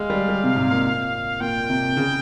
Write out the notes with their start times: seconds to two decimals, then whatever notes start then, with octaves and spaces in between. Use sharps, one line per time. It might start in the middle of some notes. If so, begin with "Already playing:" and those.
Already playing: G#3 F5
0.10 G3
0.29 G3
0.43 C3
0.56 G#2
0.71 A#2
1.40 A#2 G5
1.69 C3
1.97 C#3